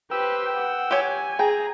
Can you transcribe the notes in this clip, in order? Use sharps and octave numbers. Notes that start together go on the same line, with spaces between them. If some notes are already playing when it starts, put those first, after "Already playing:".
G4 B4 C5 G5 E6
F#5
G4 C#5 G#5
G#4 G5 A#5